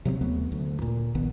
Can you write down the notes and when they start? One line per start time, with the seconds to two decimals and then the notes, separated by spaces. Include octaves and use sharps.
0.05 C3 F#3 A#3 C4
0.21 D#2 F#3 A3 B3
0.52 D2
0.82 A#2
1.15 A#1 D#3 B3